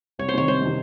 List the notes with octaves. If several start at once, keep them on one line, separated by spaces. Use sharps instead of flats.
C2 C#5
C5
C3 D#3 C#5
C2 C5
C3 D#3